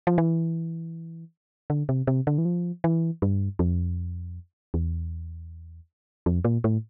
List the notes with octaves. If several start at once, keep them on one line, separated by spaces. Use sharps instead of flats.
F3
E3
D3
C3
C3
D3
E3
F3
E3
G2
F2
E2
F2
A#2
A2